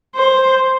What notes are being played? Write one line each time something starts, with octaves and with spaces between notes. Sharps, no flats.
C5